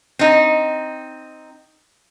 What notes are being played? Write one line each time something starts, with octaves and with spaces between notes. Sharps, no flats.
C4 D#4